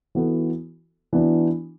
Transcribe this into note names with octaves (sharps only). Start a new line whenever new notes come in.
E3 B3 F#4 A4
E3 B3 D4 F#4